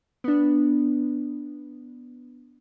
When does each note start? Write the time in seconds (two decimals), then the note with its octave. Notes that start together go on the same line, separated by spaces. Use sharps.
0.24 B3 D4